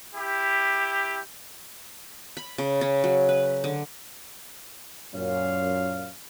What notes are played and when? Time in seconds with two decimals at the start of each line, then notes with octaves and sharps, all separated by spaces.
0.16 E4 G4
2.37 B5
2.58 C#3
2.81 C#4
3.04 F#3
3.29 B4
3.64 D3
5.14 F#2 A#2 C#5 F5